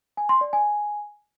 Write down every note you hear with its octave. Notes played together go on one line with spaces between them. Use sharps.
G#5
C6
D5
G#5